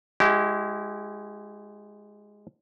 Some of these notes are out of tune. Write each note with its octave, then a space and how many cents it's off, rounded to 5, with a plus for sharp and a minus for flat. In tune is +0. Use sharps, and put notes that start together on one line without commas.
G#3 +0 E4 +0 G4 -35